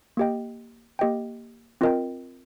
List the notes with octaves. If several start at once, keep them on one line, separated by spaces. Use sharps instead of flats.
A#3 G4 D#5 G5
A#3 G4 D#5 G5
C4 F4 A#4 D#5 G5